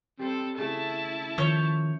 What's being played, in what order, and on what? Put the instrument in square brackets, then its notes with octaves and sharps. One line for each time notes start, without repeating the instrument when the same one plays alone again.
[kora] G3 C5 [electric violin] C4 A4
[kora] C#3 A3 A4 [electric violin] E4 A5
[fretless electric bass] D#3 F3 [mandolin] C#5 G6